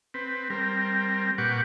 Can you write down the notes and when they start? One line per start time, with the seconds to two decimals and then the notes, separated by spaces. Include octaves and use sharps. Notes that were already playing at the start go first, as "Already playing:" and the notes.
0.14 C4 B4
0.50 G3 C4 A#4
1.38 A#2 G4 B4 F#5 C#6 D6